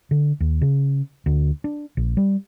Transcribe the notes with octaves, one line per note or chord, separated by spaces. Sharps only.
D3
D#2
C#3
D2
D4
A#1
G3